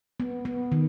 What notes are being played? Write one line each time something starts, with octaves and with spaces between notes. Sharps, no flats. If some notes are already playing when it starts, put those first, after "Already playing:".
B3
B3
D#3